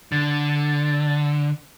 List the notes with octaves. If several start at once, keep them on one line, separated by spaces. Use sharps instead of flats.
D3 A6